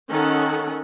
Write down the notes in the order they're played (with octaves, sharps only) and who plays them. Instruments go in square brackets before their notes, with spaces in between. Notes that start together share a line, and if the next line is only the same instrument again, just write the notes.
[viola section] D#3 C#4 A4 F#5